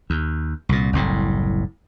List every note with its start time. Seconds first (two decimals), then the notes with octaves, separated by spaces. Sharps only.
0.10 D#2
0.69 C2 A#2
0.93 F#1 C2 A2